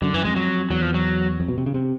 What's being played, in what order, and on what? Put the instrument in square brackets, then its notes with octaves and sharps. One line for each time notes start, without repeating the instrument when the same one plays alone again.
[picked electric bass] F#2 [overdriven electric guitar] D3
[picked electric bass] F#2 [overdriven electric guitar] E3
[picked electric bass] F2 [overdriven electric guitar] G#3
[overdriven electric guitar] F#3
[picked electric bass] E2 [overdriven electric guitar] F#3
[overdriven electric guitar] F3
F#3
[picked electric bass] F2
B2
C3
C#3
C3